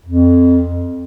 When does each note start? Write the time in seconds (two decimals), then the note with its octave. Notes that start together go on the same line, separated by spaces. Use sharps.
0.06 F2